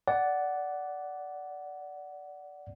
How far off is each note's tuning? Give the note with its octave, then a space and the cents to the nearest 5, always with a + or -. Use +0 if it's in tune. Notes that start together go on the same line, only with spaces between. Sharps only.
D5 -10 F#5 +10